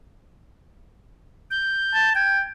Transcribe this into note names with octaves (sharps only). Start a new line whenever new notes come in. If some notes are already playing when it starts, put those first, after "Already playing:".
G6
A5
G5 G#6